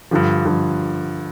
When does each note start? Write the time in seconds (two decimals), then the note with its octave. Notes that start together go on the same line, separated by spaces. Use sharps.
0.11 G2 D3 F3
0.45 G2 D3 F3